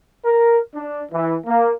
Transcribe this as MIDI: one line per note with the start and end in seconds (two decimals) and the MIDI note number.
0.24 0.58 70
0.73 1.02 62
1.11 1.34 52
1.46 1.71 58